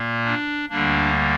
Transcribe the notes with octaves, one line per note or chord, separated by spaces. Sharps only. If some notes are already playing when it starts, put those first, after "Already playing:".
Already playing: A#2 A#3
D4
D2 D3 G3 A#3 D4